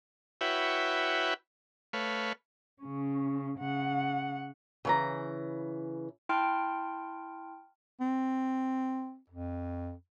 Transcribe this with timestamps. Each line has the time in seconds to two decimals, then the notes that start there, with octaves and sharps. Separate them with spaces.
0.41 E4 F#4 B4 C#5 E5 G5
1.93 A3 B4 C#5 F5
2.82 C#3 C#4
3.59 C#3 F#5
4.85 C#3 E3 A#5
6.29 E4 G5 A5 C6 F6 D7
8.00 C4
9.30 F2